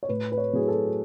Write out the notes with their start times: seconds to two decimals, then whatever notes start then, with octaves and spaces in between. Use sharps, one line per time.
0.03 C#5
0.09 A2 B4
0.32 B4
0.38 C#5
0.53 F#3 A3 E4 G#4
0.68 A4